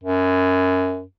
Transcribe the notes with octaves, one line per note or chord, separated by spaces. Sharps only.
F#2